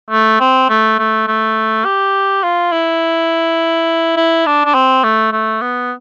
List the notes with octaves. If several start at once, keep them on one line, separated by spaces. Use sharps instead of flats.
A3
C4
A3
A3
A3
G4
F4
E4
E4
D4
D4
C4
A3
A3
B3